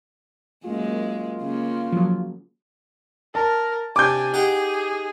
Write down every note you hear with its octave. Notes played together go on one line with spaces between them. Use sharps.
F#2 G#3 A#3 F4
C#3 A#3
F3 F#3
A#4 A5
C3 D4 G#5 D6 G6
D#4 G4 G#4 F#5